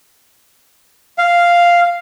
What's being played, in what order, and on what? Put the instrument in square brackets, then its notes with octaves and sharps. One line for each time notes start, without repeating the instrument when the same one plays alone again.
[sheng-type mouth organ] F5